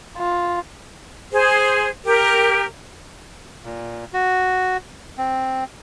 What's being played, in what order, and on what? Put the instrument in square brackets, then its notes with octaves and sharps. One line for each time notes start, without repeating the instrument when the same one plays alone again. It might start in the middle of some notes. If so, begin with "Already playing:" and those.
[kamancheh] F4
[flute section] G#4 C5
G4 A#4
[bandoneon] A#2
F#4
C4